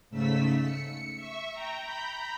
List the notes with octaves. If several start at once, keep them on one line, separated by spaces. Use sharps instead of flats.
G#2 C#3 A3 E6 B6
C#7
E5 C#6
G5 A#5
A#5 B5 G6